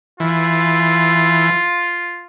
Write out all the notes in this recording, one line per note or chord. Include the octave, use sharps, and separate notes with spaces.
E3 F4